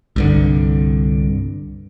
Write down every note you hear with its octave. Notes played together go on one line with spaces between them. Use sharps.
C2 G2 D3